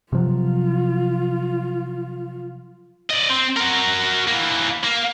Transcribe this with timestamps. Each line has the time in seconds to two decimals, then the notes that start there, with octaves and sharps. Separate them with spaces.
0.13 C3 F3 F#3 F4
3.11 D5 D#5
3.30 C4
3.57 F#4 A#4
4.28 E3 A#3
4.84 A#3